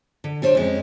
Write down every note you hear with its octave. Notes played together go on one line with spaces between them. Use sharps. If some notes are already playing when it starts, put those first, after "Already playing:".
D3
G3 D4 C5 C#5
F2 G#3 C#4